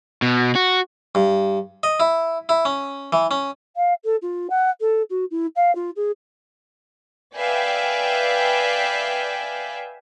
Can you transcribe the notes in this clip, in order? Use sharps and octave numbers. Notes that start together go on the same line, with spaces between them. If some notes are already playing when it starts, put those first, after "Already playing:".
B2
F#4
G2
D#5
E4
E4
C#4
E3
C#4
F5
A4
F4
F#5
A4
F#4
E4
F5
F4
G#4
B4 D5 E5 F5 G5 G#5